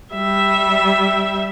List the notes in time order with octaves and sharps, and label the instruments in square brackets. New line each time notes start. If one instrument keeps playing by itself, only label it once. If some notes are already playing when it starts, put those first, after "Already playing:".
[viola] G3 E5